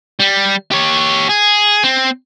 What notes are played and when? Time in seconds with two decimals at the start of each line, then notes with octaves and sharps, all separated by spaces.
0.20 G3
0.71 G4 C#5
1.29 G#4
1.84 C4